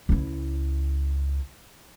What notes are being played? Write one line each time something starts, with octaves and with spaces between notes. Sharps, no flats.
C#2 E4